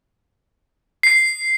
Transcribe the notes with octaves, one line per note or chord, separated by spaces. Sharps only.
C7